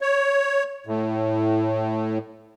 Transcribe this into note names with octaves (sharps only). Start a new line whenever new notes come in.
C#5
A2